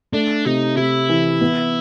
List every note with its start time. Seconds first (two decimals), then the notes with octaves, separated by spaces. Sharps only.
0.13 A3 D4
0.45 C3 D#4
0.77 C3 E4
1.09 E3
1.41 B3